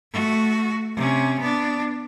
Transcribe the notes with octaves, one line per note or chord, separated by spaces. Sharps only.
A3 F#4
C3 C#4
B3 D4